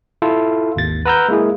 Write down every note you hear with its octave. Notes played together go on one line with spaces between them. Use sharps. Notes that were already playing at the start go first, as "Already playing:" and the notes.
E4 F4 A4
G#1 D#2 A6
B4 F#5 A#5 E6 F6 G6
G#3 A#3 E4 G#4